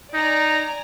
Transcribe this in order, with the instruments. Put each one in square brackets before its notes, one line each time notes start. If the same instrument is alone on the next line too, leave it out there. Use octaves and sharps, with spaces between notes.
[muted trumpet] D#4 [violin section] D5 G#5 A#5